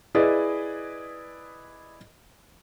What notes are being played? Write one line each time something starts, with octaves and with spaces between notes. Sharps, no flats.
E4 G#4 B4 D5 D#5